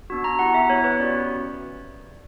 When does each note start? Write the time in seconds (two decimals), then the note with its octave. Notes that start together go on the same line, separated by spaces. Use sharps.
0.10 B3 D4 F#4
0.24 A#5
0.39 B3 E4 G4 F#5
0.54 E5
0.70 B3 E4 G4 C#5
0.84 B4
0.99 C#4 F#4 D5